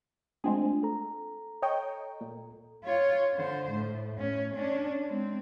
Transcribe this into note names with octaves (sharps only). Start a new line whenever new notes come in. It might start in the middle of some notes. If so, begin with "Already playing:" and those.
G#3 A3 C4 D4 F4 G#4
A4 A#5
C#5 D#5 G5
A#2
F4 C#5
D3 C5
A2
A2 C#4
C#4 D4
G#3 C4